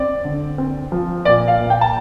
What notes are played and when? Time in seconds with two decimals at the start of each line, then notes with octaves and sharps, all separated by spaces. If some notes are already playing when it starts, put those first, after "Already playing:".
Already playing: C4 D5
0.25 D3
0.58 C4
0.92 F3
1.25 A#2 D5
1.48 F5
1.59 A#2
1.70 G5
1.81 A5